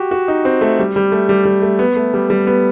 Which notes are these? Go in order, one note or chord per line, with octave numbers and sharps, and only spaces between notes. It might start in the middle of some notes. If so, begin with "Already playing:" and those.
Already playing: F#4 G4
F#4
D#4
C4
A3
G3
G3
A3
G3
G3
A3
B3
A3
G3
G3
B3